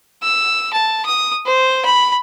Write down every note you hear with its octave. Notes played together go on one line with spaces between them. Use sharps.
E6
A5
D#6
C5
B5